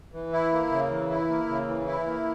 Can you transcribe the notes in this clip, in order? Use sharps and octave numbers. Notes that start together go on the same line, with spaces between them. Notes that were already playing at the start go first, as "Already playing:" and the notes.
E3
E4
A#3
C#3
E3
E4
A#3
C#3
E3
E4
A#3